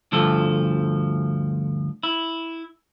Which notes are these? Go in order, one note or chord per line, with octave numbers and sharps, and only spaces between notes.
D2 G2 F3 A4
E4